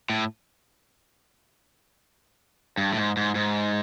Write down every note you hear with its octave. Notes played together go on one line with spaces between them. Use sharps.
A2
G2
A2
G#2
G#2
G#2